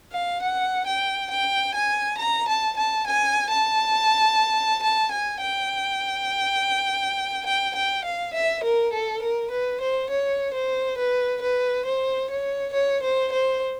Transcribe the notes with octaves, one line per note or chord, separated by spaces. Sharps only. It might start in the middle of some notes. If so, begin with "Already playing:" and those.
F5
F#5
G5
G5
G#5
A#5
A5
A5
G#5
A5
A5
G#5
G5
G5
G5
F5
E5
A#4
A4
A#4
B4
C5
C#5
C5
B4
B4
C5
C#5
C#5
C5
C5